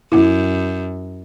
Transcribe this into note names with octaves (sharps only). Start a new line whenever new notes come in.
F#2 E4